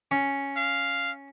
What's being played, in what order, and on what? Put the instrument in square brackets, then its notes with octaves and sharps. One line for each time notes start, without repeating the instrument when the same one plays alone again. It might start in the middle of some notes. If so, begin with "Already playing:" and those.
[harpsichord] C#4
[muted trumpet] F5